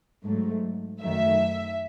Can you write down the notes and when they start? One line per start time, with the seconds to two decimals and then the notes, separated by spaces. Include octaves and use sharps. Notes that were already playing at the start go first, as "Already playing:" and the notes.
0.24 G#2 F#3 A3
1.01 F#2 D#3 F#3 A3 E5